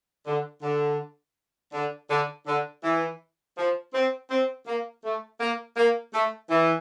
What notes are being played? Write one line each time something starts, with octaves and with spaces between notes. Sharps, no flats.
D3
D3
D3
D3
D3
E3
F3
C4
C4
A#3
A3
A#3
A#3
A3
E3